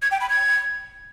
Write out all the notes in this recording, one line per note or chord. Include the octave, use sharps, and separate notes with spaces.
G#6
G5
B5
G#6